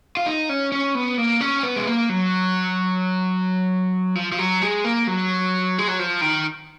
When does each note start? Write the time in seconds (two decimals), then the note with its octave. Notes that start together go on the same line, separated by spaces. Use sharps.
0.17 F4
0.26 D#4
0.49 C#4
0.72 C#4
0.95 B3
1.18 A#3
1.41 C#4
1.63 B3
1.76 G#3
1.87 A#3
2.09 F#3
4.15 F3
4.32 F3
4.39 F#3
4.62 G#3
4.84 A#3
5.07 F#3
5.78 G#3
5.88 F#3
5.99 F3
6.21 D#3